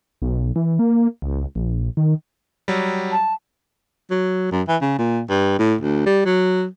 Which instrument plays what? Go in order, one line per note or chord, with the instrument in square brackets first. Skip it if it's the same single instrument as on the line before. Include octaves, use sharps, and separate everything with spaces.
[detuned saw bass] B1
E3
A#3
C#2
A#1
D#3
[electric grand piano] F#3 G3
[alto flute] A5
[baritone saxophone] F#3
F#2
E3
C#3
A#2
G2
A2
D2
G3
F#3